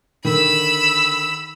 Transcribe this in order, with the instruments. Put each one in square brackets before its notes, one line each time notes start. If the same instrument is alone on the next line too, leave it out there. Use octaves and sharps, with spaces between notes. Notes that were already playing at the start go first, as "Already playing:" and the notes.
[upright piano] D3 D#3 [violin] B5 E6